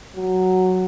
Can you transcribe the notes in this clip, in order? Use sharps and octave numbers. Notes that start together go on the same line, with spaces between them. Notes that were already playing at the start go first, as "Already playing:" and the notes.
F#3